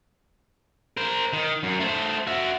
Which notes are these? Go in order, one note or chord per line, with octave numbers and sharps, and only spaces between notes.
A#4 C5
D#3
F#2
A3 C5
F#4 E5